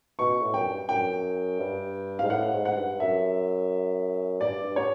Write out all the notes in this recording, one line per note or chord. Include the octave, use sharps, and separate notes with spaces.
B2 C#6
A2
F#2 G5
G2
F#2 G5
G2
G#2 F5
A2 F#5
G#2
F#5
G2
F#2 E5
G2 D5
G2
C#5